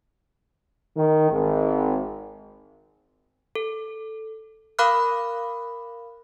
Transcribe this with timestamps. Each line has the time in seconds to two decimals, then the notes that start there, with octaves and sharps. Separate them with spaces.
0.97 D#3
1.30 G#1
3.56 A4
4.79 A#4 F5 B5 D6 F6 F#6